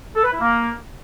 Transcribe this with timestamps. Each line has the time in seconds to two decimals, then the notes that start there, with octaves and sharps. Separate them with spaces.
0.16 A4
0.24 B4
0.33 E4
0.41 A#3